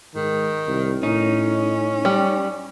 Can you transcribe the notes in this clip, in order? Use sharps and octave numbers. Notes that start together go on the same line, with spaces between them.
G#2 D#3
C2
A2 C#4 D#4
G3